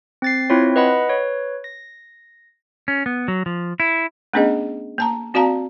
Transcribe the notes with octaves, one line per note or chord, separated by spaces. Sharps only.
C4 A6 C7
C4 E4 F4 C#5
B4 D#5 F#5 B5
B4 C#5
A#6
C#4
B3
F#3
F3
E4
A3 B3 C#4 D4 G#4 D#5
A#3 A5 A#5
C4 F#4 D5 F5 A5 A#5